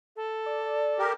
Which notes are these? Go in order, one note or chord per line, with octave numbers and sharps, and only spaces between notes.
A4
D5
G4 A#4